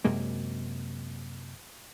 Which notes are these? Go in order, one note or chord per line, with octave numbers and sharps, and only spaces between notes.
F#2 C3 G#3 A#3